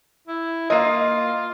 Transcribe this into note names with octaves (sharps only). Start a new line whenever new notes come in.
E4
A#3 F4 D#5